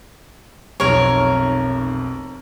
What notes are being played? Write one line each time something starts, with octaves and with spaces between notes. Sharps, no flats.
F1 B1 F2 A#4 C#5